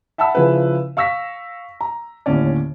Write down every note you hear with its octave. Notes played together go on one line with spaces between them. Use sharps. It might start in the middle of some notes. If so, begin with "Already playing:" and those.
E5 F#5 A5 B5 E6
C#3 F3 E4 G#4 B4
F5 C#6 E6 A#6 B6
A#5
D#2 A2 D3 C#4 D5